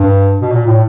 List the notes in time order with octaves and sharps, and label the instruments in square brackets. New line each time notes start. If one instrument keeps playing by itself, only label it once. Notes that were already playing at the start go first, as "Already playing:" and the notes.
Already playing: [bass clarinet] G2
B2
A#2
A2